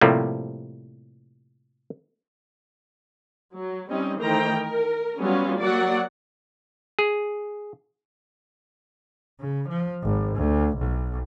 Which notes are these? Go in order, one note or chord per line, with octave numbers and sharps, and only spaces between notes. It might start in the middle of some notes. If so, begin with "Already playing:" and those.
A2 C3 F3 G3 A3 A#3
F#3
G3 C4 C#4 D#4 D#5
D#3 E3 A3 C5 G5 A#5
A#4
F#3 G3 B3 C#4 F4
F#3 A#3 F#4 D5 F#5
G#4
C#3
F3
G#1
D2
B1